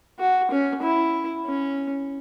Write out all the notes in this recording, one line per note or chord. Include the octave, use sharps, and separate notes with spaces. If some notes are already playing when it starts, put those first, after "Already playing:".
F#4
C#4
E4
C#4